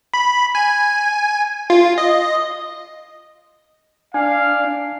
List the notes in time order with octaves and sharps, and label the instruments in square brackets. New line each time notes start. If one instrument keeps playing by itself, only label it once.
[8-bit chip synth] B5
G#5
F4
D#5
[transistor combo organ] D4 [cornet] F5 [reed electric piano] G#5